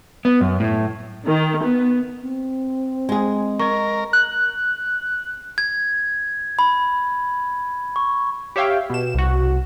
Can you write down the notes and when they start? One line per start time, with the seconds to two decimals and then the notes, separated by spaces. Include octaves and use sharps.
0.25 B3
0.41 F#2
0.60 A2
1.26 D#3
1.64 B3
2.22 C4
3.09 G#3 G#4
3.60 A#4 D#5 C#6
4.13 F#6
5.58 G#6
6.59 B5
7.96 C#6
8.56 G4 C#5 E5 F5 G5
8.90 B2 E7
9.14 C2 F#4